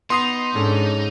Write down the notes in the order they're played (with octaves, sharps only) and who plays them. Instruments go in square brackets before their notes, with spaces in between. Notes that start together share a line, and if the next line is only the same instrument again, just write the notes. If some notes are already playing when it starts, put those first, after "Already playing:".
[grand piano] B3 [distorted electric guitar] D#4 [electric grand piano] C6 D#6 C7
[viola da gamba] G#2 [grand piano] C#4 D4 A4